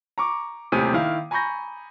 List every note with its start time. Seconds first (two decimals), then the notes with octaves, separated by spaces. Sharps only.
0.18 A#5 C#6 D6
0.72 D#1 A2 C3 G#5 D#6 D#7
0.93 D#3 E4 F5
1.31 G#5 A#5 B5 C#6 G6 A#6